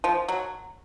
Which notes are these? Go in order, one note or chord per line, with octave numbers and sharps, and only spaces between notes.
F3
F#3